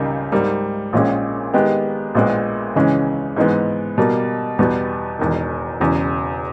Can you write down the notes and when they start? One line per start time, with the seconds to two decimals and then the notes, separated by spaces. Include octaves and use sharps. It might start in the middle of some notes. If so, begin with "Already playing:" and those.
Already playing: C#2 C#3 G3 A#3 D#4
0.32 G#2 G3 A#3
0.93 A#1 A#2 G#3 C#4 G#4
1.54 D#3 G#3 B3 G4
2.15 A#1 A#2 G#3 B3
2.75 C#2 C#3 E3 G#3 C#4
3.37 G#2 E3 G#3 B3
3.98 B2 G3 A#3
4.59 E2 B2 G3 B3
5.19 E1 E2 D#3
5.80 E1 E2 C#3